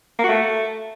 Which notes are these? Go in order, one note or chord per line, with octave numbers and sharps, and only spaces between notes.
A#3
F#4
A3